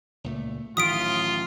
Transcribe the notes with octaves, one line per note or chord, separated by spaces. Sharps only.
C#2 A#2 A3
A1 D#3 F#3 F4 D#6 B6 D7